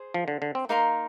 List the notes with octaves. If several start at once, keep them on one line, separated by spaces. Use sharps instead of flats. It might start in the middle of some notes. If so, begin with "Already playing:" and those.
Already playing: G#4 C5
F3
D3
D3
C4
A#3 D#4 A#4 F5 C6